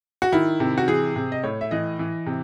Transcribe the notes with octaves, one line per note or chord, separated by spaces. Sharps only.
F#4
D#3 E4
C3
F#4
E3 G#4
C3
D#5
A2 C#5
E5
E3 D#5
E3
C3